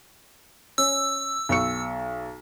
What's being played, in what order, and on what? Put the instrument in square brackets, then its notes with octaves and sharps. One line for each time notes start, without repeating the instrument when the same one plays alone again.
[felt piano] C#4 [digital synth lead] E6
[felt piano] B1 C#6 C#7